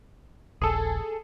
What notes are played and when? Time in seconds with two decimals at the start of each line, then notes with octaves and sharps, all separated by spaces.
0.62 D#1 A#1 G#4 A4